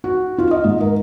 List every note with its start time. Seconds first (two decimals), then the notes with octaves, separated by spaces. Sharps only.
0.04 F#4
0.38 F4
0.51 D#5
0.64 G#2
0.80 A#4